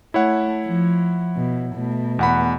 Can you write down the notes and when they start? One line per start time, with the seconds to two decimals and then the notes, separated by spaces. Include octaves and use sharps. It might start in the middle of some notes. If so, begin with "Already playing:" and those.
0.14 A3 E4 C#5 F#5
0.65 F3
1.36 B2
1.75 B2 A3
2.19 E2 F#5 B5